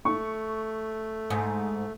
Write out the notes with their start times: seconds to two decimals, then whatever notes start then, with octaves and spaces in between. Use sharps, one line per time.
0.05 A3 C#6
1.30 G#2